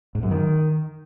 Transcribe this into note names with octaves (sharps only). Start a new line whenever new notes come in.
G#2
F#2
D#3